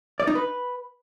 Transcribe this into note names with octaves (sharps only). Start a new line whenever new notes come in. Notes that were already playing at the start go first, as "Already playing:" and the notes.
D5
D#4
B4